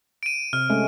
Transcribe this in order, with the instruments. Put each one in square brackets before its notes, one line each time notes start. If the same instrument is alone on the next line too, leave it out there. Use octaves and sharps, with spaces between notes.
[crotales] D7 D#7
[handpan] C3 [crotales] F6
[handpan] G#3 A3 C#4